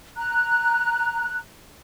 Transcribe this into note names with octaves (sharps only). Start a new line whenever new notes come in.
A#5 F#6